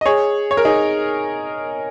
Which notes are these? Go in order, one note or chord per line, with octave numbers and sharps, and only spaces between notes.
D#5
G#4 C#5
C#5
A#4
D#4 G#4